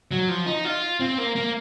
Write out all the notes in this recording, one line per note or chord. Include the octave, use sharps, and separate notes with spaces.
F#3
F3
D#4
F4
C4
A#3
A#3